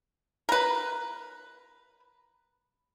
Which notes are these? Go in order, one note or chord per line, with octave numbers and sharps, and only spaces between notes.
A#4 B4